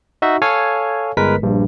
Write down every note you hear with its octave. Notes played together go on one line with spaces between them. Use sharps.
D#4 F#4 E5
A4 C#5 F5 G#5
G1 G#3 A#4 B4 B6
A#1 G2